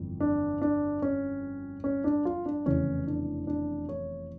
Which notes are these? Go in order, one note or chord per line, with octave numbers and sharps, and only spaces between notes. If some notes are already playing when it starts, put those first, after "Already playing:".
Already playing: G1 F2 E3
D4
D4
C#4
C#4
D4
F4
D4
F1 E2 C#3 E3 C#4
D4
D4
C#5